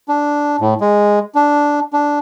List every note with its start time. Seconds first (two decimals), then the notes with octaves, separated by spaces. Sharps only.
0.09 D4
0.60 A2
0.81 G#3
1.35 D4
1.93 D4